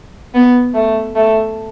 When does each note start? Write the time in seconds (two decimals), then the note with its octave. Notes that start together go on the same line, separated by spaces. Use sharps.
0.34 B3
0.74 A3
1.15 A3